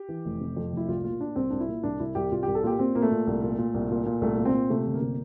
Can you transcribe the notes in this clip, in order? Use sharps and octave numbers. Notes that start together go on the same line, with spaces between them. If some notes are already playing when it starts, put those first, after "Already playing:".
Already playing: G4
E3
F1
C3
F2
F1 E4
C2 F4
A#2 F4
A#2 D4
C2 C4
C2 D4
E4
A#2
C2 D4
C2 E4
C2 G4
C2 F4
C2 G4
A4
A#2 G4
A#2 C4
A#2 A#3
A3
A#2
C2
A#2
A#2
C2
A#2
A#2
C2 A3
A#2
C4
A#2
C3 A3
G1
A#3
C3